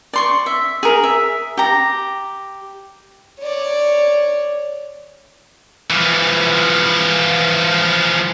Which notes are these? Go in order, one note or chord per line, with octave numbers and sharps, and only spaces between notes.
D5 C6 C#6
E5
G#4 A#4
E5
G4 A#5
C#5 D5
E3 F3